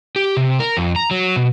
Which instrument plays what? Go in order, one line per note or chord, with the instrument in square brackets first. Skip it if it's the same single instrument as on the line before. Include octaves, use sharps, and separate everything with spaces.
[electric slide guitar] G4
C3
A#4
F2
A#5
F#3
B2